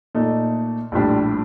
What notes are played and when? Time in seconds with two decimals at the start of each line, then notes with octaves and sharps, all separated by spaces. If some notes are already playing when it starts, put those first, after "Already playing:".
0.15 A#2 A3 D#4
0.92 A#1 A2 G3 D4